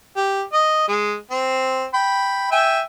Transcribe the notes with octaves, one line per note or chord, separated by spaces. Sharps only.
G4
D#5
G#3
C4
G5 B5
E5 G5 G#5